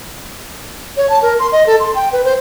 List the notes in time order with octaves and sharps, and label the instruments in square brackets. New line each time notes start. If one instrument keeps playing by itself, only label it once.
[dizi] C#5
A5
A#4
C6
D#5
A4
C6
G5
B4
C5